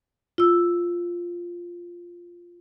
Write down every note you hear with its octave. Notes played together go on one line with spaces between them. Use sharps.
F4 E6